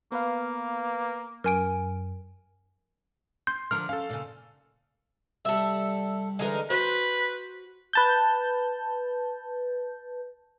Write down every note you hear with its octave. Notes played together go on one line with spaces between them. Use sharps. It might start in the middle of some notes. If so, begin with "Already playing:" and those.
A#3 B3 B4 F5
F#2 A#4 G#5 D7
C6 G6
D3 F3 A#4 F6
C#4 A4 F5
A#2 C#3
C2 G3 A4 E5
D3 E3 G#3 D#4 A#4
F#4 B4 C5
B4 A5 G6